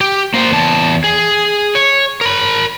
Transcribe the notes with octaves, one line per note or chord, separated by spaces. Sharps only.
G4
A#3 C5
E2 A5
G#4
C#5
A#4 B5